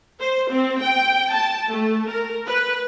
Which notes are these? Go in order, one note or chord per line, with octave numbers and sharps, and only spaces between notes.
C5
C4
G5
A5
A3
A#4
B4